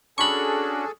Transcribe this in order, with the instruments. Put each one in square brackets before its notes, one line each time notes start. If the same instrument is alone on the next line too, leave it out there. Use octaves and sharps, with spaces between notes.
[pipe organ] C#4 D4 F#4 [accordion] G#4 A4 [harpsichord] B5 C#6